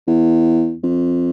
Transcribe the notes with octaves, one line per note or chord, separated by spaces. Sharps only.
E2
F2